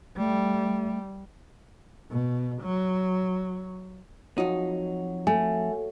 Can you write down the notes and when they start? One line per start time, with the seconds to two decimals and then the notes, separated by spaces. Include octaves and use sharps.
0.17 G3 A3
2.10 B2
2.62 F#3
4.38 F2 F#3 D#4
5.27 A3 G#5